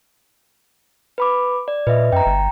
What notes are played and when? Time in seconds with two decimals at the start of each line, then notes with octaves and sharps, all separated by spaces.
1.18 B4 B5 D6
1.68 D5
1.87 A#2 B4 D#5 E5
2.12 F#2 G5 A#5
2.26 G1